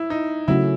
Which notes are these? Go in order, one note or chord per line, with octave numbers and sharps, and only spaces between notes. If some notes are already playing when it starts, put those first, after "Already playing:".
Already playing: E4
D#4
C#3 F#3 A3 C#4 E4 F#4